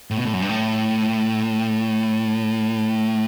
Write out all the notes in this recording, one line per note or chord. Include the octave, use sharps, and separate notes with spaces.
A2
B2
A2
F#2
G2
A2